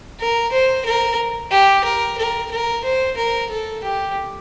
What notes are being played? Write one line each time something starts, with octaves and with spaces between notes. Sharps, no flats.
A#4
C5
A#4
G4
A#4
A#4
A#4
C5
A#4
A4
G4